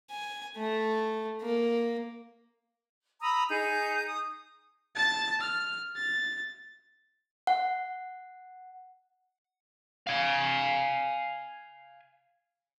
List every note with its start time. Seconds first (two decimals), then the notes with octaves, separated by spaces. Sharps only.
0.10 G#5
0.56 A3
1.41 A#3
3.22 A#5 B5 D#6 E6
3.49 D#4 G#4 G#5 G6
4.06 D#6
4.96 A5 A6
5.41 F6
5.96 A6
7.47 F#5
10.07 F5 G#5